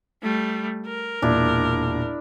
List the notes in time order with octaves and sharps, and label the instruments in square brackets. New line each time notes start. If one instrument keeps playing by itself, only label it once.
[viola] G3 A3
A#4
[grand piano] E1 A#2 [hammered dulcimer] D4 E4